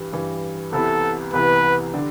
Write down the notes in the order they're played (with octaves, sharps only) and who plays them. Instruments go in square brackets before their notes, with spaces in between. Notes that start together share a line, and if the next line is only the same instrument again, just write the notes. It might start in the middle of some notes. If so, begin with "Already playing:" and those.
Already playing: [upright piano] G2 E3 G3
G2 E3 G3
[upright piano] C2 C3 E3 B3 E4 [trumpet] A4
[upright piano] C2 C3 E3 B3 E4 [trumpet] B4
[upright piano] D3 G3 D4